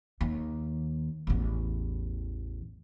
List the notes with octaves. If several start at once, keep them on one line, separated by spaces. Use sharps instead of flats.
D#2
A1 E2